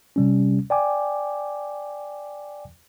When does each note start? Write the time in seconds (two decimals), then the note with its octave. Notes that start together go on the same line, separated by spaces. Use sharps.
0.16 C3 G3 C#4
0.70 D5 G5 G#5 D6